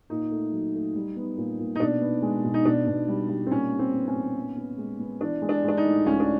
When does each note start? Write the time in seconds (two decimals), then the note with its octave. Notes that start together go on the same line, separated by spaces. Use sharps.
0.10 A#2 D#4
0.31 A3
0.53 F#3
0.74 A3
0.95 G3
1.17 B3
1.37 A#2
1.59 A#2
1.75 D#4
1.80 B2 D4
2.01 B3
2.22 G#3
2.45 B2
2.54 D#4
2.65 B2 D4
2.87 B2
3.08 G3
3.29 G3
3.46 C4
3.51 A#2 C#4
3.72 G3
3.79 C4
3.93 B3
4.08 C#4
4.14 A#2
4.36 B3
4.57 B3
4.78 G#3
5.00 B3
5.21 E3 D4
5.42 G#3
5.49 D4
5.64 G#3 D4
5.77 D#4
5.85 A2
6.06 C#2 C#4
6.20 D4